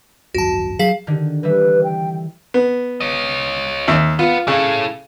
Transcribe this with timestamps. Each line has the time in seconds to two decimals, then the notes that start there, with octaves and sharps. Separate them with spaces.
0.34 G#1 C#2 F#2 F#4 A5
0.79 F#3 G#4 F5 B6
1.07 D3 D#3
1.43 E3 G3 B4 E5
1.84 G5
2.54 B3
3.01 C#5 D#5
3.88 D#2 E5
4.19 B3 F4 B4
4.48 C#3 E4 A4